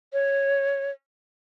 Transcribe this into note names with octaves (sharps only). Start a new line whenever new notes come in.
C#5